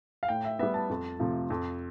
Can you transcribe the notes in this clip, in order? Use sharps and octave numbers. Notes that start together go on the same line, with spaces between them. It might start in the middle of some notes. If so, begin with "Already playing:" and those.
F5
A2 G5
E5
G3 B3 E5
A5
F2
C3 F3 A3
F2